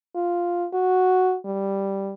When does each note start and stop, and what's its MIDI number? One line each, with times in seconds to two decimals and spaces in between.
0.15 0.67 65
0.73 1.36 66
1.45 2.14 55